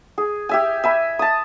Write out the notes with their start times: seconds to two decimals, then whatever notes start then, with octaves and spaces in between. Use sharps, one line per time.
0.18 G#4
0.49 G4 E5 G#5
0.84 E5 G#5 B5
1.19 A5 D#6